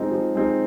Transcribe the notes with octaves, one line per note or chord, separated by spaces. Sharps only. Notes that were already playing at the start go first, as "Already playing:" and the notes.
Already playing: F3 G#3 C4 D#4
F3
G#3 C4 D#4